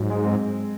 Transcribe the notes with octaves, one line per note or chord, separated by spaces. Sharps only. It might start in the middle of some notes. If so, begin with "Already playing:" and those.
Already playing: G#2 F#3
G#3
C4